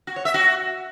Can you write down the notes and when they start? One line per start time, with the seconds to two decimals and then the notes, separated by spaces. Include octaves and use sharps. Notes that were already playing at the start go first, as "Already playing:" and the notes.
0.07 F#4
0.16 C#5
0.25 E5
0.34 F#4